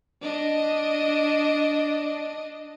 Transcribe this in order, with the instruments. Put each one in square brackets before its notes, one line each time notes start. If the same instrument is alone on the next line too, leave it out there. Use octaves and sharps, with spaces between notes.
[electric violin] D4 D#5